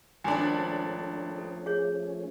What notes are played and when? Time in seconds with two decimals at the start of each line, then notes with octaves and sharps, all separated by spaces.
0.24 G#1 F3 A3 C#4 D4 G#5
1.38 A4
1.66 G#4 C#5